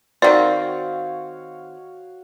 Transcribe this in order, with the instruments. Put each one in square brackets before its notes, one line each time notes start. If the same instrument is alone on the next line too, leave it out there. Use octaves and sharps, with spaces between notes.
[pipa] D#3 C4 [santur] F#4 C#5 F5 [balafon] D5